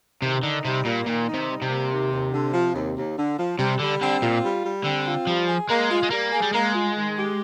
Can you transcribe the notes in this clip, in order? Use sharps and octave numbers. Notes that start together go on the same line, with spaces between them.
C3 D#3
D3 D#4
C3 G3
A#2 A#3
A#2 D#3
D#4
C3
G3
C3
A#3
D#2
D#2
D3
F3
D#2
D#2
D3
F3
C3 G3
D3 G3
D3 C4
A#2 F4
G3
G3
D3 C4
F4
F3 G3
G#4
G#3 A#3
F4
G#3
G3 A#3
G#4
G3
G#3 A#3
F4
D#3
G4